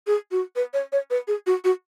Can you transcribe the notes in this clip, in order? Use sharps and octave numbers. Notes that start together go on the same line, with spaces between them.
G#4
F#4
B4
C#5
C#5
B4
G#4
F#4
F#4